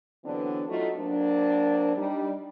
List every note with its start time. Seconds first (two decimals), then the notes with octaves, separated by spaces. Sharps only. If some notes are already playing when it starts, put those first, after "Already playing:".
0.24 D3 E3 F#3 B3 C4 D4
0.68 F#3 A3 D#4 F4 F#4
0.97 F#3 A#3 C4 D4
1.97 G3 D4 D#4